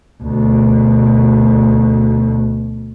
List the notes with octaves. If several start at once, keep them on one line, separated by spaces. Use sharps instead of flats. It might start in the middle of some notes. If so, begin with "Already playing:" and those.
D2 B2